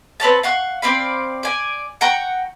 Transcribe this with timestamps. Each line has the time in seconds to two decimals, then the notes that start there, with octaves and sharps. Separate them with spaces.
0.20 C4 B4 C#5 A5
0.43 F5 F#5 C#6
0.82 C4 D5 F5 B5
1.43 D5 G#5
2.01 F#5 G5 A#5 C#6